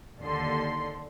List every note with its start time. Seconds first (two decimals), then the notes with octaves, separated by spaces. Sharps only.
0.20 D#2 D3 C6